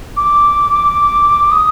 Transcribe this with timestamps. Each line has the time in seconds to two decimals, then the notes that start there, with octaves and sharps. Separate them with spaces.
0.17 D6
1.52 D#6